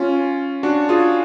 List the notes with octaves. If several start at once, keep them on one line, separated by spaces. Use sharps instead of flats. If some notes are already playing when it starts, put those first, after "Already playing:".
Already playing: C#4 F4
D4 F#4
F4 G#4